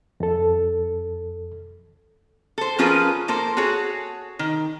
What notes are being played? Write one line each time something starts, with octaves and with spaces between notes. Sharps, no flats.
F2 A4
A4 C5
F3 C#4 F4 G#4 A#4 B4
A#3 A4 A#4 C5
F#4 G#4 A4 C#5
D#3